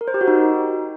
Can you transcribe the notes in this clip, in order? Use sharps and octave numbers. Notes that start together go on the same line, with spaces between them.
A#4
C5
G4
F#4
D#4